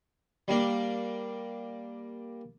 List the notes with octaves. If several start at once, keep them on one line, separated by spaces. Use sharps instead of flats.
G3 A#3 D4